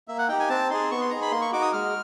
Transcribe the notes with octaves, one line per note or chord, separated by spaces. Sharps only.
A#3 E5
F#5
D#4 G4 G5
G#5
C4 A5
D#4 G#4 C6
B3 C#6
C6
D#4 G#4 A#5
B5
A#3 C6
C#6
D#4 F#4 D6
D#6
G#3 F6